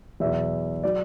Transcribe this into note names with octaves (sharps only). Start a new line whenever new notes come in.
E2 B2 F#3 E5
F#3 D5